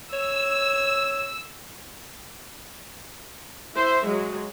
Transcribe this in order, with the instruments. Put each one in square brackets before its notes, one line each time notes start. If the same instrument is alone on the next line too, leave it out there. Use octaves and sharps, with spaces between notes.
[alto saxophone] C#5 [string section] E6
[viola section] E4 C5 E5
F#3 G#3